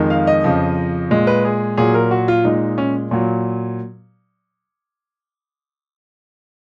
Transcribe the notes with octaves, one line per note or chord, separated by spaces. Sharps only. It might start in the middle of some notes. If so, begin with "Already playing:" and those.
Already playing: F2 D#3 G#3
F5
D#5
F2 C#3 F3
A#2 G#3
B4
G#4
A#2 F#3 G#4
A#4
F#4
F4
A#2 G#3 D#4
C#4
A#2 F#3